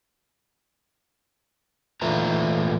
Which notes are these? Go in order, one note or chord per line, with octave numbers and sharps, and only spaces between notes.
A#2 E3 A3 F4 B4 A#5